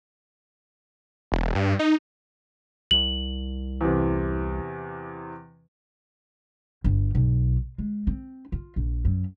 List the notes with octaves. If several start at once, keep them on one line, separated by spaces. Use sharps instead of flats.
E1
G2
D#4
C2 F#7
E2 C3
G1
B1
G#3
C4
F4
A#1
F#2